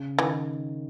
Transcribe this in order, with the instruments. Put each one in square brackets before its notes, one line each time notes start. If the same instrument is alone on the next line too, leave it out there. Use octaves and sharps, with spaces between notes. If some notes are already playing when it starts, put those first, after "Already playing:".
Already playing: [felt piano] C#3
[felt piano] D#3 [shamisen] E3